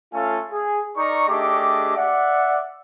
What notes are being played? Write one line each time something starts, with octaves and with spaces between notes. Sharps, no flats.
A3 C#4 F4 A4 F5 G#5
G#4
D#4 A#4 D5 A#5 C#6
A3 D4 G4 G#4 D#5 D6
D5 E5 F#5